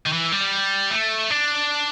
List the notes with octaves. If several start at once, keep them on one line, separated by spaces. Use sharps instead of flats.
D#3
E3
G3
A3
D4